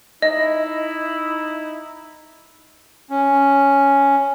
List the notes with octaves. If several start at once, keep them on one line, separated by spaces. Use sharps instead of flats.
D#4 E4 D#5
C#4